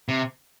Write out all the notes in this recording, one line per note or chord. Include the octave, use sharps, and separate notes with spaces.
C3